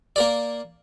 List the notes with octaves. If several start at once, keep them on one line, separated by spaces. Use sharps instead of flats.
A#3 A#4 D5